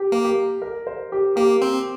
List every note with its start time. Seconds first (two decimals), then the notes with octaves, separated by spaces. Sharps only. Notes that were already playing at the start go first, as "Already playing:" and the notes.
Already playing: G4
0.12 A#3
0.25 G4
0.62 A#4
0.87 C5
1.12 G4
1.36 A#3 G4
1.62 C4